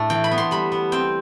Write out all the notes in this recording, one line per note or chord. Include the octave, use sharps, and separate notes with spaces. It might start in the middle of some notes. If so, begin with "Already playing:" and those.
Already playing: A2 A3 D4
E3 G5
B5
B3
C6
G3 B5
B3
C4 G5